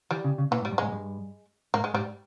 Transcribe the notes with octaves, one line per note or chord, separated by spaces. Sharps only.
E3 G3
C#3
C#3
A#2 E3
G#2
G3
G2
G#2 G#3
G2
G#2 A#3
G#3
G#2 G3